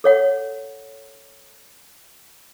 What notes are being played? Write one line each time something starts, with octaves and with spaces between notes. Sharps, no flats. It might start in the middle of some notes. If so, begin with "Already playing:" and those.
A4 C#5 F#5